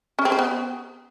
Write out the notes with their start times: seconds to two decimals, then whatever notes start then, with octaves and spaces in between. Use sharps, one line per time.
0.19 C#4
0.25 C4
0.32 C5
0.39 B3